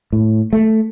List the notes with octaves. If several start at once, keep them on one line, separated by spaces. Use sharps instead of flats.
A2
A3